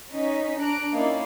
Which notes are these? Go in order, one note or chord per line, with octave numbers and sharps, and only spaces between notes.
C#4 D#4 B6
D4 A#5 F#6 D7
A#3 C#4 D#4 E4 D5 F5